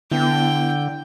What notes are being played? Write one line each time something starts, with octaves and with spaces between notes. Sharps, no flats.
D3 B3 E4 G5